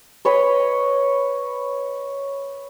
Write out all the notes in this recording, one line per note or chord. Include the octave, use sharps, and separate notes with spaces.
B4 C#5 D#5 B5